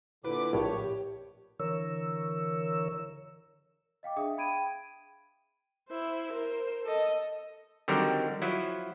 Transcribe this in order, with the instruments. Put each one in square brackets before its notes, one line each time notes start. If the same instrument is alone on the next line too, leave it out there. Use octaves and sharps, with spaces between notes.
[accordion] A#2 D3 D6 [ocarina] E4 [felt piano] B4
[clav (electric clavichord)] A#1 A2 [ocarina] G4 [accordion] C#5
[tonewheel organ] D3 E3 A#4 C#5 E6
[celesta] D#5 F5 G5 D6
D4 G#4 E5 F5 D#6
G5 B5 G#6 D7 D#7
[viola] E4 C5
A#4 C5
A4 D#5
[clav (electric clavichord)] D3 D#3 F#3 G3 C4 A#4
F3 F#3 E4